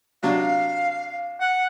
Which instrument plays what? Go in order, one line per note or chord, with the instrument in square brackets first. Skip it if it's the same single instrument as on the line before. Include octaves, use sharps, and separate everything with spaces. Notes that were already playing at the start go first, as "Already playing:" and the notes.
[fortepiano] C3 F#3 D4 [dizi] F5
[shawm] F#5